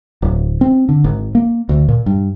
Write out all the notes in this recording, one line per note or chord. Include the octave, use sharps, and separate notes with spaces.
D1
C4
D3
G#1
A#3
D2
A#2
G2